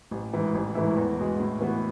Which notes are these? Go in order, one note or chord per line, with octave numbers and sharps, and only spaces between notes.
A1
G#2 E3
A1
G#2 E3 A3 E4
E2
B2 G#3
A2
E3 B3 F#4